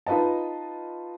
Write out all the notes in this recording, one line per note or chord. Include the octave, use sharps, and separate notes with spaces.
D#4 F4 B4 D#5 A5